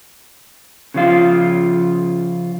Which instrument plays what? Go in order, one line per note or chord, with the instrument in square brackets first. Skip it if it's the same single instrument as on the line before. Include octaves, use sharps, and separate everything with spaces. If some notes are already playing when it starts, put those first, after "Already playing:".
[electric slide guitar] C#3 F3 F4